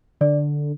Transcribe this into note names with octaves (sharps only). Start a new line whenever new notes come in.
D3 D5